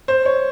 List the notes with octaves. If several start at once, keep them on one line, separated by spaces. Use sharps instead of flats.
C5
C#5